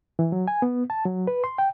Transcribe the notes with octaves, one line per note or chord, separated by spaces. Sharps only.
E3
F#3
G#5
B3
A5
F#3
B4
C6
G5